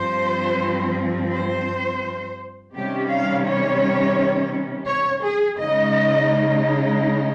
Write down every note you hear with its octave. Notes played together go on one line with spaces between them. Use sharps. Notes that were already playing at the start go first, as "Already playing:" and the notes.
Already playing: G2 F3 C4 C5
C5
C3 D#3 G3 C#4 G4
F5
C#5
C#5
G#4
C#3 G#3 D#4 D#5